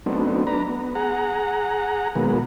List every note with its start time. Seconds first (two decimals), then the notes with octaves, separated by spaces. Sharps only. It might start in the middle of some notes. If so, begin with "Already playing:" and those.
0.06 F#3 A3 B3 C4 D4 D#4
0.47 D4 B4 A#5
0.69 B3
0.95 G#4 F#5 A#5
2.15 B2 D#3 F#3 G#3 A#3 B3